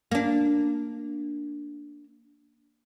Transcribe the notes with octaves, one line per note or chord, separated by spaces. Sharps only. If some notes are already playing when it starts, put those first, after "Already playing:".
A#3 D4